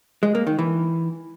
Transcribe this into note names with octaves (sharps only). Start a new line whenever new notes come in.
G#3
A#3
D#3
E3